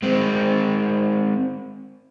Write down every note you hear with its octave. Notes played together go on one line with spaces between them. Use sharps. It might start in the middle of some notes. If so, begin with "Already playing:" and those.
G#3 C4